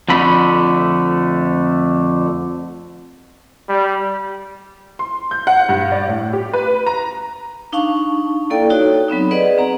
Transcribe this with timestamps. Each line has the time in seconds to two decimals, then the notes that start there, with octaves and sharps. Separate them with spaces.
0.09 F2 D3 A3 B5
3.69 G3
4.99 C6
5.31 G6
5.47 F#5
5.69 G2
5.92 D5
6.08 A2
6.33 G4
6.53 B4
6.86 A#5
7.72 D4 D#4 F5 A5 C#6
8.50 A#3 E4 A4 D5 G5
8.70 D#4 F#4 A4 C#5
9.08 F#3 B3 C4 D#4
9.31 G#4 B4 D5 D#5 F#5
9.58 C4 A#5